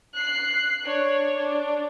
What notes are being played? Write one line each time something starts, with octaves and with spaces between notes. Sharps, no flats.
F#6 C7
D4 C#5
D4